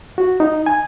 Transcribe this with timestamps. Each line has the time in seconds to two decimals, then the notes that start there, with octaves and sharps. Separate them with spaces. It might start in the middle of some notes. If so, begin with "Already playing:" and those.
0.18 F#4
0.40 D#4
0.66 G#5